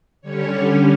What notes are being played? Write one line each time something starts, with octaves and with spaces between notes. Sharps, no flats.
D3 G3 C#4 C#5